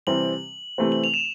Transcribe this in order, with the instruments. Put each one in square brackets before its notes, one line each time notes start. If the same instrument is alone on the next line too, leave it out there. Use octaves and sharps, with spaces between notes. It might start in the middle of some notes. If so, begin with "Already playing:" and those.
[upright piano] C3 E3 G3 C4 [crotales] F#7
[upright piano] C3 E3 A3 C4
[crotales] F#7
F7
E7